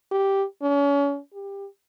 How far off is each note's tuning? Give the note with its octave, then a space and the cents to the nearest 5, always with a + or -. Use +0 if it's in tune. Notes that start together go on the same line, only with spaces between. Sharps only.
G4 -5
C#4 +35
G4 +20